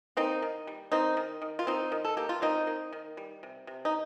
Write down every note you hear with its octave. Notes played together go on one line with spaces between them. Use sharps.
A#3 C4 D#4
D#3
G3
D#3 C4 D#4
D#3
D#3
F4
A#3 C4 D#4
D#3
A4
A#3 G4
F4
A#3 C4 D#4
A#3
D#3
G3
C3
C3
D#4